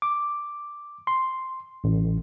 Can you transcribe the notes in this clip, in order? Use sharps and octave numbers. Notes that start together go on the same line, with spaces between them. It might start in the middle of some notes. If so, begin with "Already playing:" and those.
D6
C6
A1